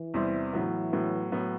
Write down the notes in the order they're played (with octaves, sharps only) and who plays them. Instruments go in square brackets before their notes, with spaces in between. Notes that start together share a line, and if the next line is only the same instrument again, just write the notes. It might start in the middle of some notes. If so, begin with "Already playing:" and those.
Already playing: [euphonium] E3
[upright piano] E2 C3 G3 C4 E4
[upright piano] A2 F#3 B3 [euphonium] E3
[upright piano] A2 F#3 B3
A2 F#3 B3